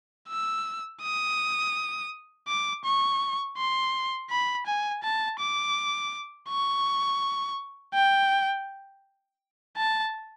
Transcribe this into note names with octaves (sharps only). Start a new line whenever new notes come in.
E6
D#6
D6
C#6
C6
B5
G#5
A5
D6
C#6
G5
A5